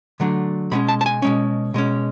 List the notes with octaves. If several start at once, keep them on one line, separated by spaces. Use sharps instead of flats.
D3 F#3 A3 D4
B2 G#3 C#4 B5
A5
A5
G#5
B2 G#3 C#4
B2 G#3 C#4